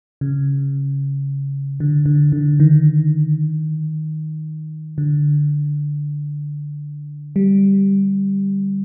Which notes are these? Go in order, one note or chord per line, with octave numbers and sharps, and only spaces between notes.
C#3
D3
D3
D3
D#3
D3
G3